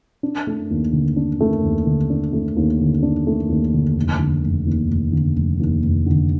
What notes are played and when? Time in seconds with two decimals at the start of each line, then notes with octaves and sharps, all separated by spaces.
0.23 D4
0.47 A3
0.71 D#2
0.93 D3
1.16 D4
1.40 A3
1.64 D#2
1.86 D3
2.10 D4
2.33 A3
2.57 D#2
2.80 D3
3.03 D4
3.27 A3
3.49 D#2
3.73 D3
3.97 F1
4.19 D3
4.43 F1
4.67 D#2
4.90 F1
5.12 D3
5.36 F1
5.60 D#2
5.83 F1
6.06 D3